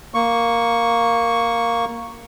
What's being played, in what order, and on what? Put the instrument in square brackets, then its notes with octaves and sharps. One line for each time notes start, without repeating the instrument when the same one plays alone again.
[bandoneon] A#3 C#6